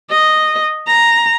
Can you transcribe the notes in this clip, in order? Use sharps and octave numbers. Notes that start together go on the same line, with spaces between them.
D#5
A#5